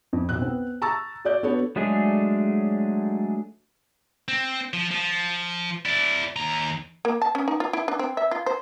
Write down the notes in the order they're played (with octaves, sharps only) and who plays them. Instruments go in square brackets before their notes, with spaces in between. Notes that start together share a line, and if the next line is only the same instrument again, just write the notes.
[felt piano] F2
B1 F#6
B3 C4
A5 A#5 C#6 E6 A6
F#4 D5 G6
B3 D4 F#4 A4 B4 C#5
[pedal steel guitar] F#3 G#3 A3 D4 G#4
[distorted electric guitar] C4
F3
F3
E4 D5
D#2 A#5
[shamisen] A#3
A5
C#4
D#4
F4
E4
D4
C4
E5
F4
C5